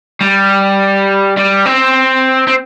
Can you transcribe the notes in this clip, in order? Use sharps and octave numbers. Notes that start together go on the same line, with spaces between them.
G3
G3
C4
C4